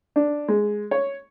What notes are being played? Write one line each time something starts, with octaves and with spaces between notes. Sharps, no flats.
D4
G#3
C#5